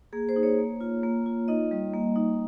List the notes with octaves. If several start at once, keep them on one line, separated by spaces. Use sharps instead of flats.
A#3 G#4
C5
D#4
C#5
A#3
F4
A#3
F4
D#4 D#5
G3
A#3
D#4